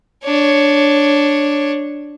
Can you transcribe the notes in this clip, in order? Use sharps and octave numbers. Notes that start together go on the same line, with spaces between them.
D4 C#5